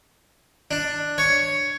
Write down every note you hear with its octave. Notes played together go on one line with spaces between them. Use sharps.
D4
C#5